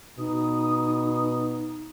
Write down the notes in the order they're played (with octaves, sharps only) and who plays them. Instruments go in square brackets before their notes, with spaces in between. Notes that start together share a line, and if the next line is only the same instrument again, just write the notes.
[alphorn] B2 [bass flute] D#4 [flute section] D#6